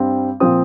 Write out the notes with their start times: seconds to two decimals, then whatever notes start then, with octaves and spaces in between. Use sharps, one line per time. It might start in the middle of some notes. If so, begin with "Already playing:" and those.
Already playing: G2 G3 C4
0.40 A#2 F3 C4 D#6